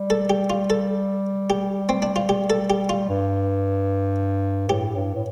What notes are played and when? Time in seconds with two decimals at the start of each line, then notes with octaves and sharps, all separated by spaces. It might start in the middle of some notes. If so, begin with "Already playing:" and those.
Already playing: G3
0.10 A4
0.30 G4
0.50 F4
0.70 A4
1.50 G4
1.89 C4
2.02 D4
2.16 F4
2.29 G4
2.50 A4
2.70 G4
2.89 F4
3.09 G2
4.69 A2 G4
4.95 G2
5.15 A2